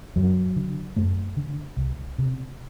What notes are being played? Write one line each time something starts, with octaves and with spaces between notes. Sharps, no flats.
F#2 F#3
D3
F#2 A3
D3
C2
C3